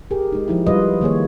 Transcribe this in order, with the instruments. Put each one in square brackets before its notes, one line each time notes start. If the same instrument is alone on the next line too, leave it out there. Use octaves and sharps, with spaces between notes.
[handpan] G4 G#4 A#4
G#3 D#4
F3 D#4 E4
G3 F4 B4 D#5
D#3 A#3 G#4 C#5